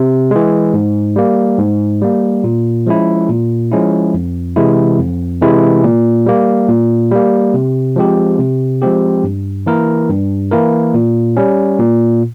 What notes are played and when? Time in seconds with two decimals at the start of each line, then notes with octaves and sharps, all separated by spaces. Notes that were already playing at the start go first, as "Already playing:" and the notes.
Already playing: C3
0.31 E3 G#3
0.74 G#2
1.16 G3 A#3
1.58 G#2
2.01 G3 A#3
2.44 A#2
2.87 F3 G#3 C#4 E4
3.29 A#2
3.71 F3 G#3 C#4 E4
4.14 F2
4.56 C3 E3 G#3 E4
4.99 F2
5.41 C3 E3 G#3 E4
5.84 A#2
6.26 G3 A#3
6.69 A#2
7.11 G3 A#3
7.54 C3
7.96 F3 G#3 C4 G4
8.39 C3
8.82 F3 G#3 C4 G4
9.24 G2
9.66 E3 A#3 E4 A#4
10.09 G2
10.51 E3 A#3 E4 A#4
10.94 A#2
11.37 G3 C#4
11.79 A#2